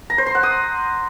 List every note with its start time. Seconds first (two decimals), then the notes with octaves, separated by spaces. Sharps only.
0.10 A#5
0.18 C5
0.27 C6
0.35 F#5
0.43 D#6